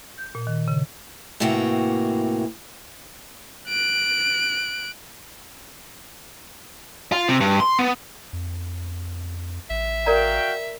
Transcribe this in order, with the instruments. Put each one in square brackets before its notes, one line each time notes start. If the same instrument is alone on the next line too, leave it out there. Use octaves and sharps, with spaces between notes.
[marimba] G6
A#2
D#3
C#3
[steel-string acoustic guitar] A2 C3 E3 A#3 F#4 G5
[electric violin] F#6 D7
[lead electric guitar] F4
C3
G2
C6
B3
[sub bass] F2
[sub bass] A1 [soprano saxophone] E5
[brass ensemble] F#4 F5 G5 [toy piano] A#4 D5 A#5